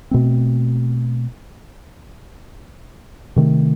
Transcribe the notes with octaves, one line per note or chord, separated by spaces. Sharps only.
B2 A3 C4
C3 D#3 A3